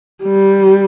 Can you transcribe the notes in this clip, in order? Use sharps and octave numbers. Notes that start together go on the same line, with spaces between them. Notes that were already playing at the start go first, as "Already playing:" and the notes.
G3